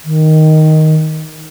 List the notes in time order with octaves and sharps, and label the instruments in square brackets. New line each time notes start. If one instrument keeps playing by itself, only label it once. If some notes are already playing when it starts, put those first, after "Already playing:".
[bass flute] D#3